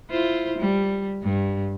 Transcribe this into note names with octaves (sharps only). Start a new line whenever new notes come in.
E4 F4 C5
G3
G2